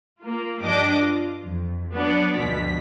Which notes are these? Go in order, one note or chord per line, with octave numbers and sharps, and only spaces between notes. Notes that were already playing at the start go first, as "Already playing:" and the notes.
A#3 F4
G2 F3 D4 G4 D#5 D6
F4
F2
F#3 B3 D4 D5
D2 G2 B2 F3 B6